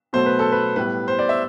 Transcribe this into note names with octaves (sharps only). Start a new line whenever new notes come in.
B2 F#3 A3 C5
B4
A4
B4
A2 G3 B3 B4
C5
D5
E5